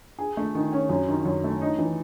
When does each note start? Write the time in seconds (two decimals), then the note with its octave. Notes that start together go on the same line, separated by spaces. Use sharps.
0.19 G#4
0.37 A3
0.55 D#3
0.72 C#4
0.90 F#2
1.08 D#3
1.25 F#2
1.44 A3
1.62 D#4
1.78 E3